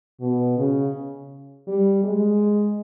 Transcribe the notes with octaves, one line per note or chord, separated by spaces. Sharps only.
B2
C#3
G3
G#3